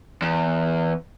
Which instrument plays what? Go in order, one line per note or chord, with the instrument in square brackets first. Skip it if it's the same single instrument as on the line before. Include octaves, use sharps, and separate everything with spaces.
[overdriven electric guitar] E2